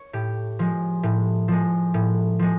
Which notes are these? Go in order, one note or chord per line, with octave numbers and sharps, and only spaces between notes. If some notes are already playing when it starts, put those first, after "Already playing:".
Already playing: C#5
A2 G4
F3 G#3
A2
F3 G#3
A2
F3 G#3